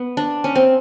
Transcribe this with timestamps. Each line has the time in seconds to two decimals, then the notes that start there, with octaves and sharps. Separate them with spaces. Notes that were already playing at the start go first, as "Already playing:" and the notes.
Already playing: B3
0.17 D4
0.44 C#4
0.55 C4